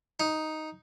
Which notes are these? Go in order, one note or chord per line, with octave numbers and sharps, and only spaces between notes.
D#4